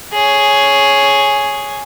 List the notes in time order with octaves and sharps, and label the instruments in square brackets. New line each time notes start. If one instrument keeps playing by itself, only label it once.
[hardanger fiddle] G#4 C#5